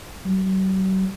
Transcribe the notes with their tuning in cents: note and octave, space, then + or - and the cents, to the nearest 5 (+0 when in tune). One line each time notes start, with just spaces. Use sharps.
F#3 +45